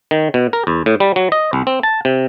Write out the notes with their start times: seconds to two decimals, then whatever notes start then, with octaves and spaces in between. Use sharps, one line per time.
0.11 D#3
0.34 B2
0.53 A#4
0.67 E2
0.86 A2
1.00 G3
1.16 F#3
1.32 D#5
1.53 C2
1.67 C4
1.83 A5
2.05 C3